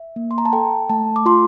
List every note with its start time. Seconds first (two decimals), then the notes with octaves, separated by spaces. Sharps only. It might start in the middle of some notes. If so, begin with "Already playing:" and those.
Already playing: E5
0.16 A#3
0.31 C6
0.38 A#5
0.45 A5
0.53 A4 G5
0.89 A3 A5
1.16 D6
1.26 F4 C6